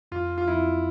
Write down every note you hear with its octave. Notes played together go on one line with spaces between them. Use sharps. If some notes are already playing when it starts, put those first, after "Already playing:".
F2 F4
F4
F2 E4